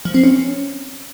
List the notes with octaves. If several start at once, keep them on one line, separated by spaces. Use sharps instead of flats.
F3
C4
C#4